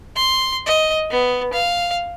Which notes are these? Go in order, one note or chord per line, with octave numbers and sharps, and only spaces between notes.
C6
D#5
B3
F5